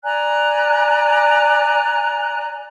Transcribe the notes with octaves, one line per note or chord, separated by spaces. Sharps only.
D5 G#5 A#5 F#6